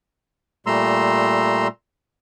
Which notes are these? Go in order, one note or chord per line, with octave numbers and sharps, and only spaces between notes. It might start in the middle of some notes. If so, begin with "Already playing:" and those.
A#2 G3 A3 A#5 C6 E6